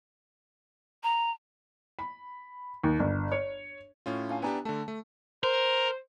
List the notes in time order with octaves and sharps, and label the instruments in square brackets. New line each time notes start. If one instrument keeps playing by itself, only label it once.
[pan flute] A#5
[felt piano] B5
D#2
G1
C#5
[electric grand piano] A2 C#4 F4
[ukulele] D4 F5 G#5
[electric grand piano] B3 D4 G4 [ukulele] E4 G#5 A#5
[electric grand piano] D3 A3 [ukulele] A5
[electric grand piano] A3
[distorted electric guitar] A#4 [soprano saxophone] C5